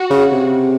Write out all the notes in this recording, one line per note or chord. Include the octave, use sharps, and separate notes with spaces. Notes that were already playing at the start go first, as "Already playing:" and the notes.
Already playing: F#4
C#3
C3